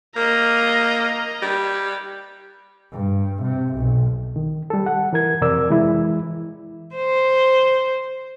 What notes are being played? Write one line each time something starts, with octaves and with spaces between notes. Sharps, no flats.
A#3 D#5 A#5
G3
G2
C3
B1
D#3
G3 A4
F#5
E3 A#4 G#6
F2 C3 A#4 D5 E6
E3 G#3 E4
C5